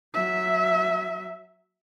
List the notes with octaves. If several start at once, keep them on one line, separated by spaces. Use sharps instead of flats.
F#3 E5